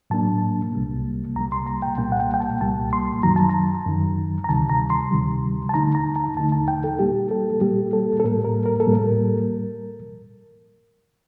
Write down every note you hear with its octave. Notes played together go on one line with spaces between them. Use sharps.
A2 F#3 A#3 D4 A5
C2 C3 G3 A#3
C2 C3 G3 A#3 A#5
C6
A#5
G5
C2 A#2 G3 A#3 G5
F#5
G5
G5
A5
C2 A#2 G3 A#3 A5
C6
F#2 D#3 F#3 A#5
A5
A#5
F#2 D#3 F#3
A#5
D2 C3 D#3 G3 A5
A#5
C6
D2 C3 D#3 G3
A5
D#2 D3 A3 D#4 A#5
A#5
A5
D#2 D3 A3 D#4 A5
A5
G5
A4
A#2 G3 A#3 G4
A4
A#2 G3 A#3 G4
A4
A4
A2 G3 A#3 A#4
A#4
A#4
A4
A2 G3 A#3
A#4